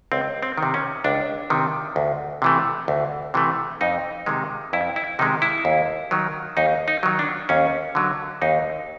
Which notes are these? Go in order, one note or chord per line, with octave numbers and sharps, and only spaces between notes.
C#2 C4
C4
D#3
C3
C#4
C#2 D4
C3 D#3
D2
C3 E3 A3
D2
C3 E3 A3
F2 D#4
C3 D#3 G#3
F2 E4
E4
C3 D#3 G#3 D#4
E4
D#2
D#3 F#3
D#2 D#4
D#4
D#3 F#3
D4
D#2 C#4
D3 F#3
D#2 D#4